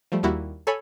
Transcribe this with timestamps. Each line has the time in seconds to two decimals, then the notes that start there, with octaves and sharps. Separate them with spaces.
0.12 F3 G3 A3
0.23 D#2 G3 A#3 E4 F#4
0.67 A4 C#5 G#5 B5